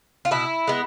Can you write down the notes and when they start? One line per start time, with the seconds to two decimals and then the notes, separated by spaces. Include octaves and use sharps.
0.25 F4
0.31 B2 E4
0.67 G#3 B3